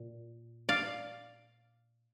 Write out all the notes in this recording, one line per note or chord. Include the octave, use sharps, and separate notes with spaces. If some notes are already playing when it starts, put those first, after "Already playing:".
Already playing: A#2
D5 F5